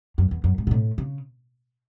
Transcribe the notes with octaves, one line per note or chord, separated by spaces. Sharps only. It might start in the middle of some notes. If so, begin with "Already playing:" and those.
F#2
E2
F#2
G#2
B2
A2
C#3